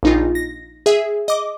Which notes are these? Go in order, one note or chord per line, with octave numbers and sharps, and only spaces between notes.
A#1 D#4 F4
A#6
G#4 E5
D#5 D6